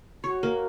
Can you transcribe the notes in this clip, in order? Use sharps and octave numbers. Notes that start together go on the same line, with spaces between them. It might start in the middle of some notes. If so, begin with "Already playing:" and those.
F#4 C#5
A#3